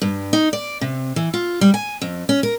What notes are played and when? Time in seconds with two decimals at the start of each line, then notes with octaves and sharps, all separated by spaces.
0.02 G2
0.33 D#4
0.53 D5
0.81 C3
1.16 E3
1.34 F4
1.61 G3
1.74 G#5
2.02 F2
2.29 C#4
2.43 A#4